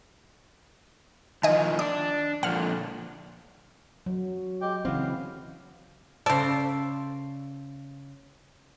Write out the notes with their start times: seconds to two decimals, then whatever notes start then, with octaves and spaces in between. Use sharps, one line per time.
1.43 D#3 F3 D#5 G#5
1.79 D4 D6
2.43 A#2 D3 F3 F#5 F6
4.06 F#3
4.61 G#3 G4 G5
4.85 C#3 E3 B3 C4 F5
6.26 C#3 A4 C5 D5